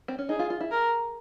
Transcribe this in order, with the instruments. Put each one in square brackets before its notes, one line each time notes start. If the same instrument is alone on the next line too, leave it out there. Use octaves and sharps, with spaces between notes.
[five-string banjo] C4
C#4
[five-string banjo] D#4 [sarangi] G#4
[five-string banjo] F4
F4
E4
[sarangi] A#4